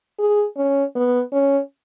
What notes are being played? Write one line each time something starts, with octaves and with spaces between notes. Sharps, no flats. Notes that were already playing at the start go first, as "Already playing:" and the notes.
G#4
C#4
B3
C#4